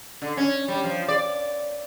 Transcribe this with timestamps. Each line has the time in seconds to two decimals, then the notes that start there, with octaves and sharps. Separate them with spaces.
0.22 D3
0.37 C#4
0.68 G3
0.84 F3
1.08 D5